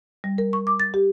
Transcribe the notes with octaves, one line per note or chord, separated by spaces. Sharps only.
G3
A#4
C#6
D6
A6
G4